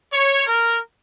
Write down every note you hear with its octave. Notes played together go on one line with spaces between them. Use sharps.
C#5
A#4